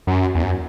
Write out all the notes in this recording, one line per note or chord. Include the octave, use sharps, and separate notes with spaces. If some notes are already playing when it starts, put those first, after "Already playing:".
F#2
E2
F#2